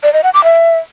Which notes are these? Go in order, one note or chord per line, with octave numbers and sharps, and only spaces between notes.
D5
D#5
F#5
D6
E5